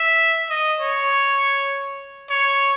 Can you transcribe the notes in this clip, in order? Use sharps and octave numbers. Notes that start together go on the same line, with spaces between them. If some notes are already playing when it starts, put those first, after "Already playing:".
Already playing: E5
D#5
C#5
C#5